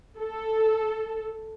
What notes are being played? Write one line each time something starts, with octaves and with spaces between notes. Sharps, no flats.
A4